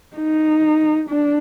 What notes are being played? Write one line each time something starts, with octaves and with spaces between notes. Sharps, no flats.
D#4
D4